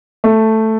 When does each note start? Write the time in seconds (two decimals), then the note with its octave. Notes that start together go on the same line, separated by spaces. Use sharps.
0.24 A3